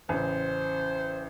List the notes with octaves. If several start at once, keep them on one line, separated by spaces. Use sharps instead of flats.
A1 C#3 C5